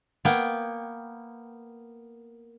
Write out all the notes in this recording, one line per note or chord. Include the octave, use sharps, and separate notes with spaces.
A#3 B3 G5